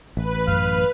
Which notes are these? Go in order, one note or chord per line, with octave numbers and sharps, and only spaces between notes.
A1 B4
F#2 F5